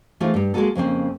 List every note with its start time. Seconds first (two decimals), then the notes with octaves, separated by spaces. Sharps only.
0.20 E3 A3 C4 D#4 F4 G#4
0.34 G2 G3
0.54 G#3 A#3 C#4 F#4 G#4 A4
0.75 F2 C#3 A#3 C4